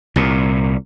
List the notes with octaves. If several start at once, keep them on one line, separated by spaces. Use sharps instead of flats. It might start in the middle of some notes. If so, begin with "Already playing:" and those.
C2 A#2